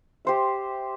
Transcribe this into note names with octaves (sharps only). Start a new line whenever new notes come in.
G4 C5 E5